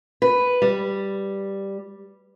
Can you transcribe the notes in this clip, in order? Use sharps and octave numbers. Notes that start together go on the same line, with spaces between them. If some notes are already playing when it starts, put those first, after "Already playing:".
B4
G3